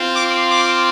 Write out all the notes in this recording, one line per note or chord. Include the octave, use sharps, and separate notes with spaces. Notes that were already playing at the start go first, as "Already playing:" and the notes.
Already playing: C4 F4
D6
D6